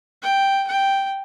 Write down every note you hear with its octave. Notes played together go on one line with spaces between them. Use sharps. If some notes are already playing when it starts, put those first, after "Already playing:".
G5
G5